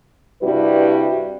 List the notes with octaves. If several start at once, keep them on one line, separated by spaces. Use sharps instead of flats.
G2 C3 G3 E4 F#4 B4